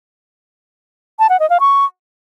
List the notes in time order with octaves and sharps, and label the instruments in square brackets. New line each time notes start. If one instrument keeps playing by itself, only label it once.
[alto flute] A5
F#5
D#5
F5
C#6